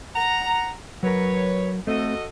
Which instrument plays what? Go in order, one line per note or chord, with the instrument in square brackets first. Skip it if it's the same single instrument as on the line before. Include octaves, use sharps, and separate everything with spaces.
[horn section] F#5 A#5
[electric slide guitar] F#3 A#4 [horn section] B4 C#5
[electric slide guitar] A3 C4 [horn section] F#4 A4 D#5